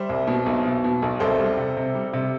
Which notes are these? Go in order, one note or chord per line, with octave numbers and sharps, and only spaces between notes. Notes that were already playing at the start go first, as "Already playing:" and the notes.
Already playing: G3 C5 E5
C2
B2
B1
B2
B2
B1
C2 A4 C5
G3
C3
C3
G3
C3